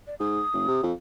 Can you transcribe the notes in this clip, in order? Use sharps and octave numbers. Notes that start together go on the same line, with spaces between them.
D5
G#2 D#6
F#1
C3
F2